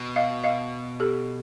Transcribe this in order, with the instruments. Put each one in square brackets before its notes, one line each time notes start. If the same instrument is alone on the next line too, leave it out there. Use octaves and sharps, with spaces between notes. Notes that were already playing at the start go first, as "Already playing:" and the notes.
Already playing: [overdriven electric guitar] B2
[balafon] D#5 F5
D#5 F5
G4 A4